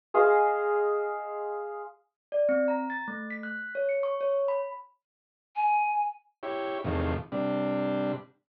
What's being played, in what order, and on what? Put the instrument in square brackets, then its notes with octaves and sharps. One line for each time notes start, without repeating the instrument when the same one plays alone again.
[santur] G#4 C5 D#5 F5
[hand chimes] D5
C4
A#5
A6
A3
B6
F#6
C#5
C#7
C#6
C#5
B5
[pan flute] G#5
[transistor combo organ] E4 G4 C#5
E2 A2 C3 D#3 F3
C3 G3 D4